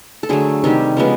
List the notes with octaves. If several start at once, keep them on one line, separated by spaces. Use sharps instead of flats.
A4
D3 F#3 A3 G#4
C3 D#3 G3 G4
C#3 F3 G#3 B3